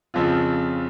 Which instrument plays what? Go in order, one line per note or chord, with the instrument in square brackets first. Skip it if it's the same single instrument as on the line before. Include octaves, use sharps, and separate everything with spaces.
[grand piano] F2 C#3 F3 C4 F4